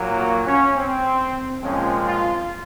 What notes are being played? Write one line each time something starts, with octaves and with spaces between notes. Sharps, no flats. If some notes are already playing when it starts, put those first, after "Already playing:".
Already playing: A#2 F#3 A#3
F#4
C#4
C4
A#2 F3 G#3 C4 C#4
F4